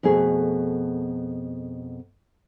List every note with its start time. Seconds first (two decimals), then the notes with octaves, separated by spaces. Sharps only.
0.03 F2 B2 A3 G#4